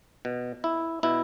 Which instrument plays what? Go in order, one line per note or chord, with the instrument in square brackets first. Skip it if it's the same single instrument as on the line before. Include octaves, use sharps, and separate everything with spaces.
[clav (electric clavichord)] B2
E4
B2 E4